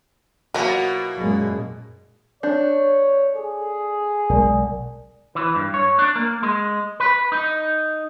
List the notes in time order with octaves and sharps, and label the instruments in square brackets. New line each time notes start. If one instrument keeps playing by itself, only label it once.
[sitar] B2 A#3 [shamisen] F3 F#3 [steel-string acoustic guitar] E4 F#4
[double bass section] F#2 A#2 G#3
[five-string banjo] D4 [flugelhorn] C#5 [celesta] G6
[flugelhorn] G#4 [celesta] A4
[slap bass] B1 G#3 [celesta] A#4 D5 G#5
[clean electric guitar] E3
G2
C#5
D4
A#3
G#3
B4
D#4